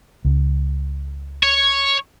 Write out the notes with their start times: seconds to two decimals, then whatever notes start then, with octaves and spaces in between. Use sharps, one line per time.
0.25 C#2
1.43 C#5